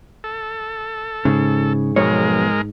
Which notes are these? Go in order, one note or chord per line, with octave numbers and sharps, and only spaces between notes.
A4
G#2 C#3
B1 F2 G#3 A#4 C#5